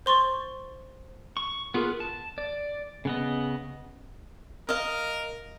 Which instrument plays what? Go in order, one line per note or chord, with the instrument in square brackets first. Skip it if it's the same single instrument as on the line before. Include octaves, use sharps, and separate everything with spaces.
[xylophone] C5 C6 C#6 A6
[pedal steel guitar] C#6
B3 F4 G#4 A#4 B4
A5
D5
C#3 B3 D#5
[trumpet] A#4 [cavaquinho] D#5 F5